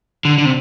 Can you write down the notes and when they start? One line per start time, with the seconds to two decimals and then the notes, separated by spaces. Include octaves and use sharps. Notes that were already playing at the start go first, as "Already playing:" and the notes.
0.25 D3
0.38 D3
0.45 C3